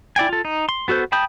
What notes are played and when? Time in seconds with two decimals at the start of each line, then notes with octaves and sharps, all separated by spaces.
0.16 E4 D5 G5 G#5
0.29 F4 A4
0.45 D#4
0.69 C6
0.88 B3 F#4 A4 C5
1.12 G5 A5 B5 D#6 G6